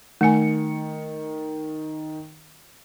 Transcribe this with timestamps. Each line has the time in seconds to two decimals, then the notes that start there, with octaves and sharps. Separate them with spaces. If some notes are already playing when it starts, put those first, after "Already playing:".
0.21 D#3 A3 G#5 C#7